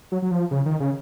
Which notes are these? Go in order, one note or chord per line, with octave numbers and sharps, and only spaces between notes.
F#3
F#3
F3
C#3
D#3
C#3